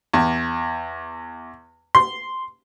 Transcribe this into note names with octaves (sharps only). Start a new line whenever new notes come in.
E2
C6